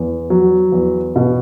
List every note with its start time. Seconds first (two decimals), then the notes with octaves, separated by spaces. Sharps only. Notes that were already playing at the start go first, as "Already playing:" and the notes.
Already playing: E2
0.30 F#3
0.72 E2
1.16 B2